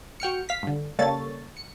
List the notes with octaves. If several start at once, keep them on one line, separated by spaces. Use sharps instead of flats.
F#4 G5 F6 C#7
F5 B6
G2 D3
C#3 G3 A#3 A4 C#5 A6
C#7